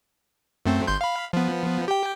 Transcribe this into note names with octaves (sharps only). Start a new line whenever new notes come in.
F#2 A3 C4
G1 C6 G6
F5 B5
F3 B3
G4 G5